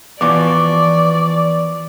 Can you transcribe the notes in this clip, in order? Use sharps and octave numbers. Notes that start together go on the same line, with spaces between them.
E3 F3 B3 D5 C#6 D6